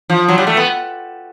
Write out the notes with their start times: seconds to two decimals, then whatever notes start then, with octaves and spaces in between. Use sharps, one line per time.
0.10 F3
0.28 F#3
0.38 G3
0.47 A3
0.57 B3